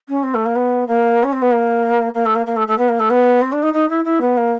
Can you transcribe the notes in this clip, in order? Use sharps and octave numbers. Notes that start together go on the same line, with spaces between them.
C#4
C4
A3
A#3
B3
A#3
C#4
C4
B3
A#3
A#3
A3
A#3
A#3
A3
A3
B3
A#3
A3
B3
C4
D4
D#4
D#4
E4
E4
B3
A#3